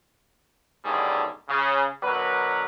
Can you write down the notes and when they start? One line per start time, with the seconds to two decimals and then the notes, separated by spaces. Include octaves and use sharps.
0.85 B1 A2 D3 D#3 G3 G#4
1.49 C#3
2.03 B2 D3 F#3 A#4 B4